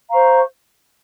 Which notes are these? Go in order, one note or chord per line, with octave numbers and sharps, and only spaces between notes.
C5 F5 A#5 C#6